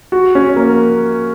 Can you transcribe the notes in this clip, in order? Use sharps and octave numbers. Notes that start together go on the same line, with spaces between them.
F#4
C#4
A#3